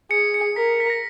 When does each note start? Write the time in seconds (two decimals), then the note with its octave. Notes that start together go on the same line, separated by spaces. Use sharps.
0.11 G#4 C#7
0.34 C#7
0.56 A#4 B6
0.80 B6
0.90 A#6